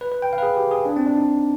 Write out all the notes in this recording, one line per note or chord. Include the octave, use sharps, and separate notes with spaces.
B4
B4
G5
F5
B4
G#4
G4
G#4
D4
C4
D4
D#4